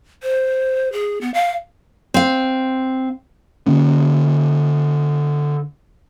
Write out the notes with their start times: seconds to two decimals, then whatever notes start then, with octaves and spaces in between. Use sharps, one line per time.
0.23 C5
0.92 G#4
1.21 B3
1.34 F5
2.14 C4 F5
3.66 D3 A#3 C#4